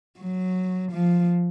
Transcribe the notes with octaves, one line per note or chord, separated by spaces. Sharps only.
F#3
F3